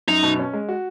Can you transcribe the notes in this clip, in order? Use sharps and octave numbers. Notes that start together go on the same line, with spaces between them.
F#2 D#4
B2
C#4
G#3
F#4